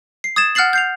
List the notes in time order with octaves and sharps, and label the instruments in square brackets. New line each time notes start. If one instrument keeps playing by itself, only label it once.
[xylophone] C7
D#6 G#6 A6 E7
F#5 F6 F#6 A6 C7 F#7
G6 C7 F7